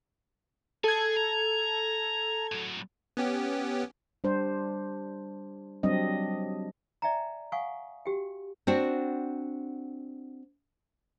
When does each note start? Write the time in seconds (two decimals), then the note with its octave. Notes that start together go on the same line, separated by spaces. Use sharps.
0.84 G#4 A4 G#6
1.16 A#5
2.52 A2 F#3
3.17 B3 C#4 G4
4.24 G3 D4 C5
5.83 F#3 G3 C4 D4 D#5
7.02 D5 E5 G5 G#5 A#5
7.52 F5 F#5 G#5 C#6 D#6
8.06 F#4 G4 G5
8.67 C4 D4 F#4